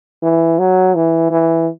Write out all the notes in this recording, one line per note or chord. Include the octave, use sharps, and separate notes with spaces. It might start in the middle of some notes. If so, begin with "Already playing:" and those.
E3
F#3
E3
E3